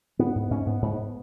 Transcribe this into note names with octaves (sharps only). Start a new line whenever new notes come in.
G#2 B3
G#2
G#2 C#4
G#2 B3
G#2